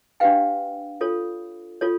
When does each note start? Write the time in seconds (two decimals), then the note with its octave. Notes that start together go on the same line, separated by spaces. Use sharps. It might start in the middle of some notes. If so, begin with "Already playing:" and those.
0.20 D4 G4 B4 F5 G5
1.01 F4 A4 C#5
1.81 F4 A4 C#5